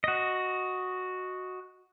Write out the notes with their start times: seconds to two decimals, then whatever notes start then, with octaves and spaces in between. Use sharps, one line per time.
0.04 F#4 D#5